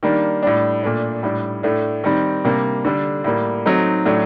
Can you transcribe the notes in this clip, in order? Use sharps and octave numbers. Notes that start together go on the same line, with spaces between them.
D#3 G3 A#3 D4
A2 G3 D4
A#2 A3 D4
A2 G3 D4
A2 A3 D4
D#3 G3 C4
C3 G3 A#3 D4
D3 G3 D4
A2 G3 A#3
F#3 A3 C4 D#4
A2 F#3 A3 D4